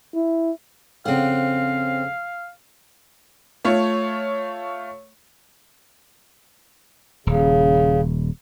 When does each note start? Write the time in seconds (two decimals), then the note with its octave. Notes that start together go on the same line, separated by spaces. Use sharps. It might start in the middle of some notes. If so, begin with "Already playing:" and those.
0.14 E4
1.06 F2 C#3 C4 F5 F#5
3.65 A3 F4 C#5
7.27 D#1 C#3